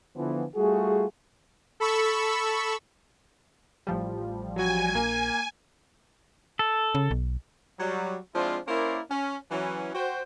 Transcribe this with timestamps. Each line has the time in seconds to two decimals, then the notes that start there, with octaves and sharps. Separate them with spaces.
0.16 D3 E3 F3 B3
0.56 G3 A3 F4 F#4 G#4
1.80 A4 B5 C#6 E6
3.87 A1 F3 G3
4.56 F#3 F#4 G#5
4.95 A#1 A#3
6.59 A4
6.95 C#3
7.11 B1
7.79 F#3 G3
8.35 F3 G#3 C4 D4 E4 F4
8.67 A#3 C#4 E4 A#4 C5 D5
9.10 C#4
9.51 E3 F#3 C#4
9.95 F#4 C5 G5